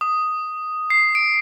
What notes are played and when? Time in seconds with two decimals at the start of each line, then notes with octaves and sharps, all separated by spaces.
0.01 D#6
0.90 C7
1.15 D7